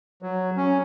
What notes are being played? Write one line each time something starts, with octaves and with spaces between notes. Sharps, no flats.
F#3
C#4